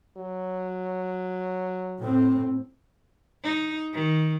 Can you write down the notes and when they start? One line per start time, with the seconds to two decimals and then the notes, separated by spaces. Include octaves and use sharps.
0.17 F#3
2.00 A2 C4
3.43 D#4
3.94 D#3